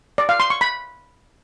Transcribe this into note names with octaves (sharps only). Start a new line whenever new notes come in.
D5
F5
C6
C#6
B5